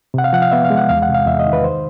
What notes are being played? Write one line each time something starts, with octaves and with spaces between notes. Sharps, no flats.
C3 F#5
F5
F3 F#5
F5
B3 E5
F5
G#3
F#5
E2 F5
F#5
C3
F5
E2 E5
D#5
D#3
B4
C5